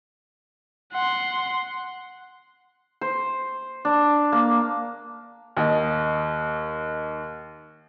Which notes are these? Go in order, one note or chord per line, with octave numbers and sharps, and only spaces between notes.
F#5 C6
C5
D4
A#3
D#2 D#5